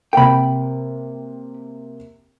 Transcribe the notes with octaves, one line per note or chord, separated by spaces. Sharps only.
C3 A#3 G5 B5